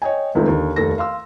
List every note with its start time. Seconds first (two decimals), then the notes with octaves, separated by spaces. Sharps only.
0.02 C#5 D#5 G5 G#5
0.35 C#2 D#3 F3 A3 C4
0.47 D#2 D3
0.76 F1 D#2 A4 A#6
0.98 F5 C6 E6